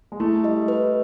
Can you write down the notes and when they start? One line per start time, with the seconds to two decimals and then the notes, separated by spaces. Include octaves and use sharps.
0.12 G#3
0.20 A3 E4
0.44 G3 D#5
0.68 B4